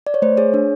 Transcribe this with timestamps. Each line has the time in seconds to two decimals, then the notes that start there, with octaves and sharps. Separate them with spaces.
0.07 D5
0.14 C#5
0.22 A3 C5
0.37 G#4 C#5
0.54 D4